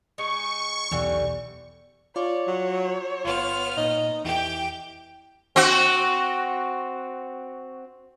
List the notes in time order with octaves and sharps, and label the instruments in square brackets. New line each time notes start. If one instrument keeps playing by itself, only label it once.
[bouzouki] G#3 D#4 [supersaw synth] C#6
[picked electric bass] B1 E2 [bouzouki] D3 E3 G3
[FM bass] F4 [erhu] C#5 [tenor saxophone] D5
[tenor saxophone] F#3
[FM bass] G1 [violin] B3 F6 [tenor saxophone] F4
[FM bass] A#2 [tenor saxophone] D#4
[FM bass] E2 [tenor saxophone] E3 [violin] G4 G5
[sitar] C4 F#4